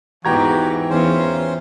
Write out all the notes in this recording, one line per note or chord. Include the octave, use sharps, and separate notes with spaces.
E2 G#2 E3 F#4 G4 G5 A#5 G#6
E2 C#4 F4 C5